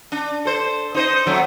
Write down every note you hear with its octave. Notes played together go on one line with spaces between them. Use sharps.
D4
A4 C5
D#4 C5 D#5
F2 F#3 A3